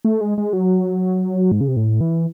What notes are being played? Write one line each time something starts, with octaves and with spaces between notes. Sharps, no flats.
A3
G#3
G#3
F#3
G#2
C#3
C3
A2
E3